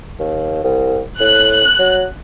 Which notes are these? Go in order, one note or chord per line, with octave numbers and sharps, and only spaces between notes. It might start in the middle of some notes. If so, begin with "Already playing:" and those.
D#2
C2
A2 F#6
F#3